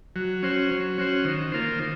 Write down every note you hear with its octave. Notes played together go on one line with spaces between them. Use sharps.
F#3
C#4 F#4 C5
F#3
C#4 F#4 C5
D#3
A#3 F4 C5
D#3